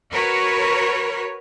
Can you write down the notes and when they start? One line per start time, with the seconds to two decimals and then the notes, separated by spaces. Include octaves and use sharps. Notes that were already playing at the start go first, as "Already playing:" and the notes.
0.11 F#4 A#4 B4 C#5